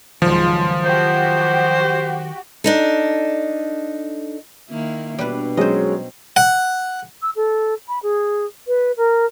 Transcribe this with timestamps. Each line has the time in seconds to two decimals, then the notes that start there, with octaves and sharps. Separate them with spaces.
0.22 C#2 G#2 D#3 F3 F#3 F4
0.84 F#4 G4 C5
2.64 D4 D#4 A4
4.69 D#3 A#3 E4
5.19 B2 G3 D4 B4
5.57 F#3 G#3 C#4 C5 D#5
6.36 F#5
7.22 E6
7.36 A4
7.88 B5
8.03 G#4
8.67 B4
8.97 A#4